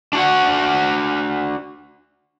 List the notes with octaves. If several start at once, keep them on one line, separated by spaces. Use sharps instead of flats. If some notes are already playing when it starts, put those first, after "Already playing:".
D4 F#4 F#5